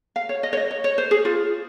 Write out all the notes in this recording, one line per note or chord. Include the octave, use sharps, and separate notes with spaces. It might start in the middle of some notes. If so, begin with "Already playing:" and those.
F5
C#5
D#5
C#5
D#5
C#5
C#5
C5
G#4
F4